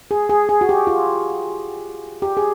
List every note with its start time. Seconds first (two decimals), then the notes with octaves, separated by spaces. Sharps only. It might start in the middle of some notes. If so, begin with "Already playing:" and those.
0.11 G#4
0.30 G#4
0.49 G#4
0.61 F#4
0.69 G4
0.87 F4
2.22 G4
2.37 G#4